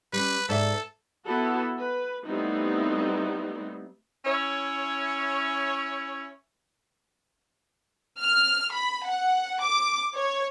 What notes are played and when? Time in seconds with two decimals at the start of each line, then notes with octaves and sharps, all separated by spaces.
0.13 G3 C#4 B4
0.49 G#2 A4 D5 E5
1.25 B3 E4 F#4 A4
1.79 B4
2.26 G3 A3 B3 C4 D#4 E4
4.25 C#4 E4 C#5
8.19 F6
8.73 B5
9.07 F#5
9.61 D6
10.15 C#5